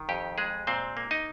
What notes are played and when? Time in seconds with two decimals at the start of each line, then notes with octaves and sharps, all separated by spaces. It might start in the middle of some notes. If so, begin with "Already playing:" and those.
Already playing: D#3
0.09 F2 G4
0.38 G#3 G#4
0.67 A#2 C4 C5
0.97 A#3
1.11 D#4 D#5